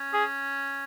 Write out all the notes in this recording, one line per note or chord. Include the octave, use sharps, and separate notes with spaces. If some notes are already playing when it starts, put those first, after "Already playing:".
Already playing: C#4
G#4